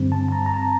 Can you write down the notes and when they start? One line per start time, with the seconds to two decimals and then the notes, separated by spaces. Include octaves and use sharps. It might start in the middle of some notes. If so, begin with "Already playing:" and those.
Already playing: G2 D3 G3 C4
0.12 A5
0.28 A5
0.32 A#5
0.46 A#5
0.54 A5